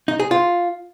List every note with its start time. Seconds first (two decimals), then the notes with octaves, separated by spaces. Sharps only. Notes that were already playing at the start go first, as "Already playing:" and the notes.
0.08 D#4
0.20 G#4
0.31 F4